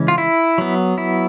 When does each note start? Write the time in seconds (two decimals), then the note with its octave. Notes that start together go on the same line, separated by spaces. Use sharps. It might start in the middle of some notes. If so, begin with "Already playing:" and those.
Already playing: C#3 E3 G#3 C#4
0.08 F4
0.18 E4
0.58 F#3 B3
0.98 E4